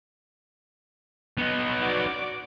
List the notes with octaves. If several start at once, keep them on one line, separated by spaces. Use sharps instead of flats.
B3 D#4
F#4 D5 D6